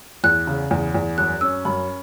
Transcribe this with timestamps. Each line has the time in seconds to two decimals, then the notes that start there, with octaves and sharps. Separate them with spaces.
0.24 E2 F#6
0.47 C#3
0.71 E2
0.94 E2
1.18 F#2 F#6
1.41 C#4 E6
1.65 F#2 B5